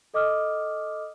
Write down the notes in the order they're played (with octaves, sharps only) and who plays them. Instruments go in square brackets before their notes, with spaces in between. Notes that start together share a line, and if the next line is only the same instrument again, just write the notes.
[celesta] A4 D#5 D6 D#6 F6